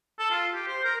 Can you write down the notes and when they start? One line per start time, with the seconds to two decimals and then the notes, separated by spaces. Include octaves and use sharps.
0.19 A4
0.31 F4
0.54 G4
0.68 C5
0.85 A#4